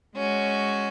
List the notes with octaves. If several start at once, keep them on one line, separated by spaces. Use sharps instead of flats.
G#3 C#4 F#4